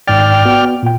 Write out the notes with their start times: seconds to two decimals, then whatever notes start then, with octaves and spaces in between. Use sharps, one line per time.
0.07 G#1 G#2 D5 G5 F6 A6
0.45 B3 F#4
0.83 A#2 G5